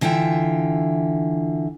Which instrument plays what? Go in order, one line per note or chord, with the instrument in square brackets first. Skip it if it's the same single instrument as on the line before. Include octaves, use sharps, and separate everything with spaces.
[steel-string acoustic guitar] D3 E3 F4 E5 G5